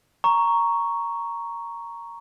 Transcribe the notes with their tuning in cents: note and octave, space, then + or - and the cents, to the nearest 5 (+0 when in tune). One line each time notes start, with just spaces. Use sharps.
A#5 +0 C#6 +5